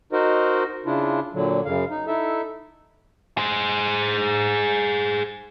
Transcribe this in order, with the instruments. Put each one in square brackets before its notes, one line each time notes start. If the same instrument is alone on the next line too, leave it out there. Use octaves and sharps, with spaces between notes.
[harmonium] D#4 F#4 A#4 C5 D#5
C#3 D4 E4 F4
A#2 D3 F#3
F#2 C#3 F5
D#4
D#4 E4 A4 E5
[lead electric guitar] G#4 C5